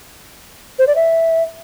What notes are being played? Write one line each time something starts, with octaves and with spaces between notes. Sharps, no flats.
C5
D5
E5